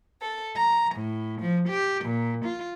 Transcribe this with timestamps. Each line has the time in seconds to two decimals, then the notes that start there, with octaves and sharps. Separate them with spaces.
0.22 A4
0.55 A#5
0.94 A2
1.39 F3
1.68 G4
2.04 A#2
2.44 F4